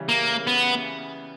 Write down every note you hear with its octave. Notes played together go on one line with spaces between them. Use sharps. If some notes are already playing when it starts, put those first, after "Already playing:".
Already playing: C#3 E3 G3 C#4
A#3
B3